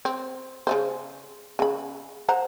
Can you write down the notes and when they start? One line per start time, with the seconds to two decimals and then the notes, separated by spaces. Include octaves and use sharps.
0.05 C4
0.67 C#3 A3 C5
1.59 C#3 B5
2.29 C5 F#5 A#5